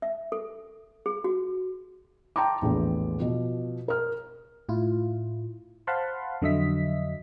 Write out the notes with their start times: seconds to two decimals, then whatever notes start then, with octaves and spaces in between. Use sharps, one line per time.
0.02 E5
0.32 A4
1.06 G#4
1.24 F#4
2.36 G5 A5 A#5 C6 D6
2.62 A#1 E2 A2
3.19 B2 F3
3.88 A#4 F6
4.69 A2 E4 F4
5.87 C5 F5 F#5 A5 B5 C6
6.41 F2 D3 F#3 D#5 E5 B6